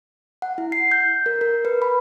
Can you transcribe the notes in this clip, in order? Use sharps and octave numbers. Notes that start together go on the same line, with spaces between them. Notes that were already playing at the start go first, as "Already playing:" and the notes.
F#5
E4
C7
G6
A#4
A#4
B4
B5